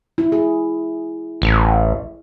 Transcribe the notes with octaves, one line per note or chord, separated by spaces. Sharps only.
E4
G#4
A1